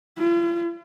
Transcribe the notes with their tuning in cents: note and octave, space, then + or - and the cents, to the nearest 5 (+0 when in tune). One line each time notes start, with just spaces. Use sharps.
F4 -45